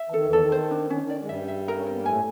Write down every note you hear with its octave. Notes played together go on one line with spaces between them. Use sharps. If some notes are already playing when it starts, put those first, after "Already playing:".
Already playing: E5
E3
D#3 A4
E2 E3
A4
D#3
C5
D4
D#3 C#4
D#3
D5
G#3
G2 G3 E5
E5
A#4
C#4
C4 A#4
B3
A#3
A2 A3 G#5